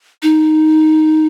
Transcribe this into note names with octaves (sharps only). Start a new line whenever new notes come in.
D#4